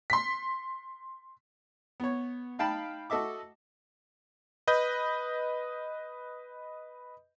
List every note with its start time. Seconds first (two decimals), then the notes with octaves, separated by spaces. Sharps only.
0.10 C6 B6
2.00 B3 C#5
2.59 D#4 F5 G5 A5 B5
3.10 F#4 A4 D#5 E5 D6
4.68 B4 D#5 G6